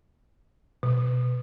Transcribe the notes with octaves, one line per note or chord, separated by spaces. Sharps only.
B2